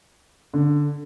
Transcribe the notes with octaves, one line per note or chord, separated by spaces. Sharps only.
D3